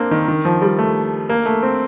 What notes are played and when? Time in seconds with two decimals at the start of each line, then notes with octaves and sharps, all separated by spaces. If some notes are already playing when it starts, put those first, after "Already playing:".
Already playing: A#3 C4 D4
0.11 D#3
0.28 D#3
0.45 F3
0.62 G3
0.78 A3
1.30 A#3
1.46 A3
1.63 C4